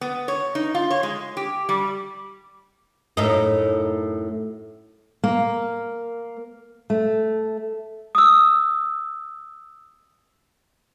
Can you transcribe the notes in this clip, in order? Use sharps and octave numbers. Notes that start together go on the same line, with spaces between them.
B3
C#5
D#4
F4
C#5
G#3
G4
G3
F#2 A2 D#4
A#3
A3
D#6 E6